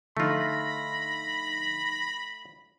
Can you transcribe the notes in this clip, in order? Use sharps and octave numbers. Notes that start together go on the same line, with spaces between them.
D3 F3 A3 D#4 F4 B5 A#6